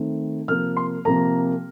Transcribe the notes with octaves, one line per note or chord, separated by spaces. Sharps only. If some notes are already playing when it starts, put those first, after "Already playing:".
Already playing: D#3 A3 C4
C3 F3 A#3 F6
C6
C3 F3 A#3 A#5